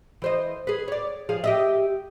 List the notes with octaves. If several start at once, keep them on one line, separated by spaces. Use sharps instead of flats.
E3 C5 D#5
G#4 B4
C#5 D5
F3 G#4 F5
G4 D#5 E5